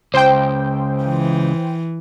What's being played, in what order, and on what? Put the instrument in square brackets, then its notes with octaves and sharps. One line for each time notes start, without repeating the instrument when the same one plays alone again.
[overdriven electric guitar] C#2 [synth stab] C5 G5
[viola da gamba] E3